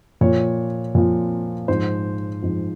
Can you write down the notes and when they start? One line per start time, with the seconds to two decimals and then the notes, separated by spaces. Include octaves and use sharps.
0.21 A#2 F3 C#5
0.95 A#2 F3
1.68 G#2 F3 C5
2.42 G#2 F3